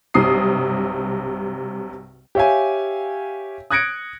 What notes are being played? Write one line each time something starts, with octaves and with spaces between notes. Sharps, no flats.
B1 G2 C3 D#6 C7
G4 C#5 E5 F5 G5 G#5
D#6 F#6 G#6 A#6 C#7 D7